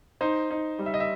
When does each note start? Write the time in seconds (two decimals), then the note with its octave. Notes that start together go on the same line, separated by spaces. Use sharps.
0.21 D#4 C5
0.50 D#4
0.79 G3
0.86 E5
0.94 D#5
1.00 E5